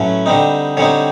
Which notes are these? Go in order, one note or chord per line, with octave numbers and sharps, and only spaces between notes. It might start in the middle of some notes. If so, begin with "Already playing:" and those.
Already playing: A2 F#3 A3 C#4 B4
D3 G3 C4 D#4
D3 G3 C4 D#4 C#5